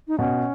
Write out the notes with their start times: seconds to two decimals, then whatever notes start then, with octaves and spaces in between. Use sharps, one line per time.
0.08 D#4
0.19 B2 C#4